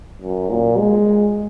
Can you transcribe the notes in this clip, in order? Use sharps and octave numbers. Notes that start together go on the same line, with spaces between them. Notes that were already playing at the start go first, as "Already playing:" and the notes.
F#2
A#2
G#3